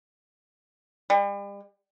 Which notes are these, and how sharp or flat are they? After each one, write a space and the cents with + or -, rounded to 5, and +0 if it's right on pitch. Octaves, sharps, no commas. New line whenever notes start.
G3 +40